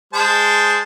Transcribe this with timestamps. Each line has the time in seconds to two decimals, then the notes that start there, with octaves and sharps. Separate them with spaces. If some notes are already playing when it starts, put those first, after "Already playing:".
0.13 G#3 C5 A5